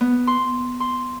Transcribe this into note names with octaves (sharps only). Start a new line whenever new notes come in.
B3
C6
C6